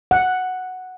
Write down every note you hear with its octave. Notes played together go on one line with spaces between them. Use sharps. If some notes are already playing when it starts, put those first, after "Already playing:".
F#5